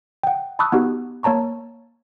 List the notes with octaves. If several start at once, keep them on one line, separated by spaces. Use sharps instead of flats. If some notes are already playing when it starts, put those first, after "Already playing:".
F#5 G5
A5 B5 C#6 D#6 E6 F#6
B3 D#4 F#4 G4
A#3 C#5 A5 A#5 C#6